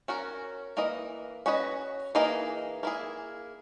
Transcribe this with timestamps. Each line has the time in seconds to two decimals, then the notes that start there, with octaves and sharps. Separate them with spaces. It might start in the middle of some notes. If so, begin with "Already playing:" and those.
0.08 C#4 F#4 A#4
0.77 E3 A#3 D#5
1.46 C#4 F#4 B4 D#5
2.15 E3 A#3 D#4 G#4 D#5
2.83 A#3 E4 G#4